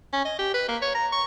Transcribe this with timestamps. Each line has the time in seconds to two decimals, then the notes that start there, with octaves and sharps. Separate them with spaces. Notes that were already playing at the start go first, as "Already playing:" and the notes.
0.13 C#4
0.25 D#5
0.39 G4
0.54 B4
0.68 A#3
0.82 C#5
0.95 A#5
1.12 C#6